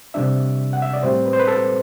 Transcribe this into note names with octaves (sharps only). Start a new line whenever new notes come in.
C3 G3 D4 E5
F#5
E5
D5
A2 G3 C4 C5
B4
C5
B4
A4